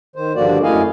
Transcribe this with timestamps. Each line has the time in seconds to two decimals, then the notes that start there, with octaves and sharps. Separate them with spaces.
0.16 D#3 C5
0.35 G2 D3 F3 A#3 F#4 D5
0.63 F#2 A3 E4 D#5 F5 G#5